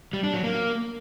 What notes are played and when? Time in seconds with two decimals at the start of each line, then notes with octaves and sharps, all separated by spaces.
0.13 G3
0.24 D4
0.34 F#3
0.44 A#3